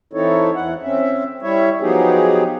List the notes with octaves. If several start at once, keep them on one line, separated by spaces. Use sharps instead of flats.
E3 C4 D#4 E4 A4 C#5
E2 E3 F#5
C4 C#4 E5
G3 E4 C#5 E5
F3 F#3 B3 D#4 G4 G#4